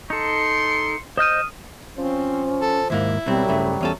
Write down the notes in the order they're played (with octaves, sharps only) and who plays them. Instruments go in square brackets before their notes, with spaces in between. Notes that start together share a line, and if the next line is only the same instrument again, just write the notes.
[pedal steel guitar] D#4 A4 [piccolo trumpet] C6 [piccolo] C#7
[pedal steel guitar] C5 D#5 G6 [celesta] D#6 F6 D#7 [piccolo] E7
[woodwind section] F3 [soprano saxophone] C4 [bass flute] C#4
[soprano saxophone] A4
[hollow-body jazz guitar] D#2 G#2 A#3 [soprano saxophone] E4
[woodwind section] C2 F#3 [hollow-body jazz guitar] B2 C4 [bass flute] G3
[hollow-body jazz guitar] G2 C#3 A3
E2 C#4 A4